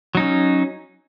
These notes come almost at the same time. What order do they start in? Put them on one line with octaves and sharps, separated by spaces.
F#3 D#4 C#4